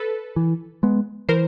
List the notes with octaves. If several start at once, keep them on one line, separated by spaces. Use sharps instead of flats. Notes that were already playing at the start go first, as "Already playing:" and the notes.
Already playing: A4 B4
E3
G#3 B3
E3 A#4 C5